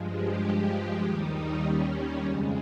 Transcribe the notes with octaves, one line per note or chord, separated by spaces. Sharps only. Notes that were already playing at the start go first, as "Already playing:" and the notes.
Already playing: G2 F3 G#3
G4
D#2 D#3 G3 D#4
C#4
F2 C#3 G#3